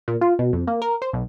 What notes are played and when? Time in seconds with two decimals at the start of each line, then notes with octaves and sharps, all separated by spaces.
0.08 A#2
0.21 F4
0.39 B2
0.53 F2
0.67 A#3
0.82 A#4
1.02 C5
1.13 B1